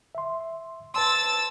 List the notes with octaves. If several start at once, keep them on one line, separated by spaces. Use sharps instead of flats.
E5 C6
B4 A5 C6 E6 A6